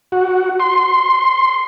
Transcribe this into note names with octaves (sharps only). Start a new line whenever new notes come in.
F#4
C6